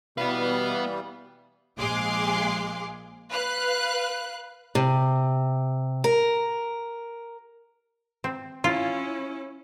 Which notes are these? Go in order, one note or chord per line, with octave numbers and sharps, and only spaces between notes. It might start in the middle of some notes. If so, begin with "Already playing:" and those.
B2 E3 G3 B3 B4 F5
A#1 G#3 G#4 F5 C6 D6
B4 F5 F#6
C3
A#4
C4
C#4 E4 F4